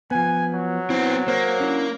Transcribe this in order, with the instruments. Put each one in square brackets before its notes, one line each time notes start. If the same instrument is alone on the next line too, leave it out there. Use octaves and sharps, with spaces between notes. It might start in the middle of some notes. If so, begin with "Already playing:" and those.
[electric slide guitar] F3 B3 [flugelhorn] G#5
[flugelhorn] F#3
[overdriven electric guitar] B3 C4 [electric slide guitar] E4
[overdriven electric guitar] A#3 [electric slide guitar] C5 C#5
[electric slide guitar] C#4 D4 E4